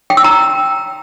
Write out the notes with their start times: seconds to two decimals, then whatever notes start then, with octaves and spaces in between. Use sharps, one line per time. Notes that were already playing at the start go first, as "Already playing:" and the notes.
0.10 G5
0.17 E6
0.24 A#5